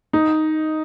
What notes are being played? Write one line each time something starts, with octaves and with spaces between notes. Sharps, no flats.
D#4